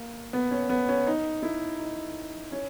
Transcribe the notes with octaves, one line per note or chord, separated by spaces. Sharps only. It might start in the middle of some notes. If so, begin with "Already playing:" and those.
Already playing: A#3
B3
C#4
B3
C#4
D#4
E4
D#4
C#4